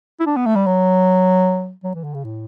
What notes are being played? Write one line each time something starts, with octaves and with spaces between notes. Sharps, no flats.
E4
D4
B3
A3
G3
F#3
F#3
E3
D3
C#3
A2